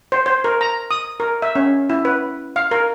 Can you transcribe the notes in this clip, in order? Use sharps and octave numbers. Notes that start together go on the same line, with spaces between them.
C5
C5
A#4
A#5
D#6
A#4
E5
C#4
E4
B4
F5
A#4